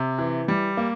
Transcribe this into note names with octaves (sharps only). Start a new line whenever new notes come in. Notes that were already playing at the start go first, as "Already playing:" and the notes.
Already playing: C3
E3
G3
A#3